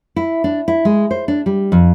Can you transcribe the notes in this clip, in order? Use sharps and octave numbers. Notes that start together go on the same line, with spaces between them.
E4
D4
E4
G#3
C5
D4
G3
F2